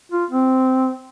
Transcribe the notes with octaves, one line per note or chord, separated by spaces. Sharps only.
F4
C4